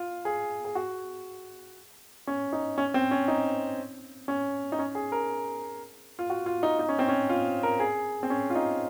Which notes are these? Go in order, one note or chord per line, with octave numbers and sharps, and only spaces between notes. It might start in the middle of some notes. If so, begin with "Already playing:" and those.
Already playing: F4
G#4
G#4
F#4
C#4
D#4
C#4
C4
C#4
D#4
C#4
D#4
C#4
G#4
A#4
F4
F#4
F4
D#4
D#4
C#4
C4
C#4
F4
A#4
G#4
C4
C#4
F4
D#4